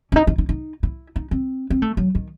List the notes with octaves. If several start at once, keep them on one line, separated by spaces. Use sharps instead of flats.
C#4
D#4
D#4
D#4
D#4
E4
D#4
C4
C4
A3
F#3
D#3